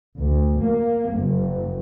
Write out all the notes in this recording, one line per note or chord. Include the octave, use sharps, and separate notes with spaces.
D2
A#3
F#1